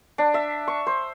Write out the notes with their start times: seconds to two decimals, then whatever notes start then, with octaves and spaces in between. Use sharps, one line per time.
0.18 D4
0.34 E5
0.68 C#6
0.87 C5